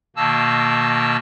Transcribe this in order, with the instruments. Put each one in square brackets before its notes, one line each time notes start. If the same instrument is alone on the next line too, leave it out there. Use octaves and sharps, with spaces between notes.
[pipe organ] B2 D#3 A#3 A5 E6